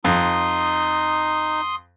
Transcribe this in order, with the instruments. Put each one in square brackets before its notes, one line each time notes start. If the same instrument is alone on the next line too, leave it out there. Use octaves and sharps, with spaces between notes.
[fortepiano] F2 [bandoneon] D#4 [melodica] C6 D#6